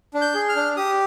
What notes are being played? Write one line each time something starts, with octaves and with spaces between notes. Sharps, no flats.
D4
G6
G#4
F6
D4
G4 D#6